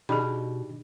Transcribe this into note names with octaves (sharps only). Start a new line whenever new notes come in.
B2 D4 D#4 G4 G#4 B5